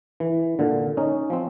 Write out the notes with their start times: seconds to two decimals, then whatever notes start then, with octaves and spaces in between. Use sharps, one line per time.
0.20 E3
0.59 A#2 D3
0.97 C#4 D#4
1.30 F3 C4